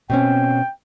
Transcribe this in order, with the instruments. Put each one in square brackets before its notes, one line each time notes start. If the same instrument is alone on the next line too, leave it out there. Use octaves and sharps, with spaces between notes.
[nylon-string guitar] B2 C4 C#4 [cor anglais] G5